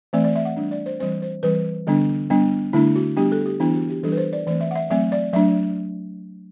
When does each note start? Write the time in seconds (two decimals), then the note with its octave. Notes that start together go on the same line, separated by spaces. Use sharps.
0.13 E3 A3 C4 D5
0.24 D5
0.36 E5
0.45 F#5
0.57 G3 D4
0.71 D5
0.86 C5
1.00 E3 G3 C4 C5
1.22 C5
1.43 E3 G3 C4 B4
1.87 D3 G3 B3 D4
2.30 G3 B3 D4
2.73 D3 A3 D4 E4
2.95 F#4
3.17 G3 B3 D4 G4
3.32 A4
3.46 G4
3.60 E3 B3 D4 E4
3.74 F#4
3.89 G4
4.03 E3 G3 D4 A4
4.12 B4
4.17 C5
4.33 D5
4.47 E3 A3 C4 D5
4.61 E5
4.71 F#5
4.76 E5
4.90 F#3 A3 C4 E5
5.12 D5
5.33 F#3 A3 D4 E5